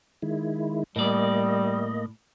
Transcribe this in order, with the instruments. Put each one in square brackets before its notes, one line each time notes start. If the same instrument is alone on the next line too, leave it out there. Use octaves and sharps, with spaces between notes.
[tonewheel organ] D#3 G#3 E4
[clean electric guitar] A2 D5 [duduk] G3 [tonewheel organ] A#3 D#5